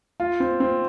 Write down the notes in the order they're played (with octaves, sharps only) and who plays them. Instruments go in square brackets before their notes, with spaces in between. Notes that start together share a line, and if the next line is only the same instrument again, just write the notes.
[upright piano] F4
C4
C4